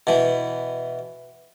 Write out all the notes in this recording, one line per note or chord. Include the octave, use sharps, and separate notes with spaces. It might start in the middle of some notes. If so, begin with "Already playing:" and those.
B2 E3